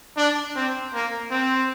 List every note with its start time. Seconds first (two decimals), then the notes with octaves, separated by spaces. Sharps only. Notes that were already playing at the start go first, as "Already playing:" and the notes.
0.17 D4
0.56 C4
0.94 A#3
1.31 C4